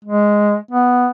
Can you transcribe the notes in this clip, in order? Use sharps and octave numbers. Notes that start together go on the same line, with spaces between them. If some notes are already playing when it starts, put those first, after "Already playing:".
G#3
B3